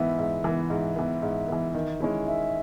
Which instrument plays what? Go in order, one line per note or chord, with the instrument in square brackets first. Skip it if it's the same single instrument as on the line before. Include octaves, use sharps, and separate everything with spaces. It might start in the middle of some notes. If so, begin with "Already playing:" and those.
Already playing: [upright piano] G#2 E3 B3 [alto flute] E5
[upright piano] G#2
E3 B3
[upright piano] G#2 [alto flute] E5
[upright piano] E3 B3
G#2
E3 B3
D#3
G#3 C#4 E4
[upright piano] D#3 [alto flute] E5